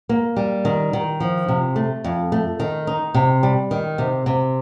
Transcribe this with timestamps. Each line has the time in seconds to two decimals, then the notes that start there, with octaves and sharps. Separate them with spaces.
0.09 A#3
0.37 G3
0.65 D#3
0.93 D#3
1.20 F3
1.48 C3
1.76 A3
2.04 F2
2.32 A3
2.60 D#3
2.87 D#4
3.14 C3
3.43 G3
3.71 D#3
3.98 C3
4.26 C3